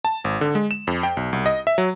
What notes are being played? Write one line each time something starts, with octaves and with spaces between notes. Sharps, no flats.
A5
G#1
D3
G#3
E7
F2
G5
B1
C2
D#5
E5
F#3